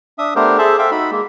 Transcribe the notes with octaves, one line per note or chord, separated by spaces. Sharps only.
D4 E5 D#6
A3 B3 D4 G4 A#4 C5
G#4 A4 C5 E5 A5
A4 C5 E5 F5 G5
D#4 F#4 B5
G#3 A#3